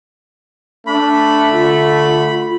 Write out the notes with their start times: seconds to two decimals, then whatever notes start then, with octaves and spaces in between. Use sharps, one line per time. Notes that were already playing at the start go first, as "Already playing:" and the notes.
0.87 A3 D4 B5
1.52 D3 F4